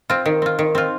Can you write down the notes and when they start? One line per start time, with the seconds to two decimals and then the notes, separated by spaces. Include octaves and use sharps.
0.10 C4 F4
0.26 D#3
0.42 C4 F4
0.59 D#3
0.75 C4 F4